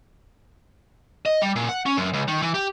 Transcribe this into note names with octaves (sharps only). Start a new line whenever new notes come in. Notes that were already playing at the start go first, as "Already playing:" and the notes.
D#5
G3
A#2
F#5
C#4
F#2
C#2
D#3
E3
G4